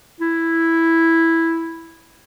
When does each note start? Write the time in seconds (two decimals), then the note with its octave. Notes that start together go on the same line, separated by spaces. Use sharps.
0.21 E4